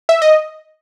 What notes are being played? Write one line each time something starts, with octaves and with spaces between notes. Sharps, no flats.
E5
D#5